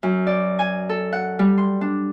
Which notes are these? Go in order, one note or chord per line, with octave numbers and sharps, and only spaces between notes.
F#2
D5
G#5
A4
F#5
G3
C6
D4